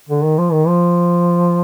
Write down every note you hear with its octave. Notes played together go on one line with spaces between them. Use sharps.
D3
D#3
F3
D#3
F3